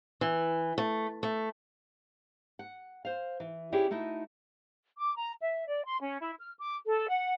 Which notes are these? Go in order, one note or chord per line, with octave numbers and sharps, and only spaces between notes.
E3
A3
A3
F#5
C5 F5
E3
C#4 D4 E4 G4 G#4 C#5
A3 D#4 E4 F#4
D6
A#5
E5
D5
C6
C#4
E4
F6
D6
A4
F#5